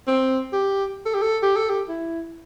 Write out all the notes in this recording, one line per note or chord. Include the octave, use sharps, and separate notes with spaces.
C4
G4
A4
G4
A4
G4
A4
G4
E4